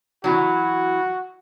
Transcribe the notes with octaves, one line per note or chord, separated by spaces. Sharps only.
E3 F#3 F#4